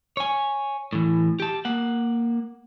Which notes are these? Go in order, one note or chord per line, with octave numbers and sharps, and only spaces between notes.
C#5 G#5
A2 E3
G4 A5
A#3 F#5